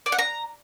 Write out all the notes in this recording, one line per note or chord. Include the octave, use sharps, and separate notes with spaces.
D5
F#5
A#5